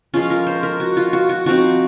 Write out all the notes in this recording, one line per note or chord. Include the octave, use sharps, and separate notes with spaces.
F3 G#3 C#4 F4
A#4
C5
A#4
F#4
F4
F#4
F#4
F3 C4 D#4 F#4